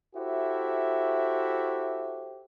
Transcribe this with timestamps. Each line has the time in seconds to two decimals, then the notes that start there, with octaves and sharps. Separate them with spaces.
0.14 E4 F#4 G4 A4 C5 E5